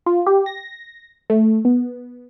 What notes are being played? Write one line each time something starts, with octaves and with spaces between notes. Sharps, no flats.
F4
G4
A#6
A3
B3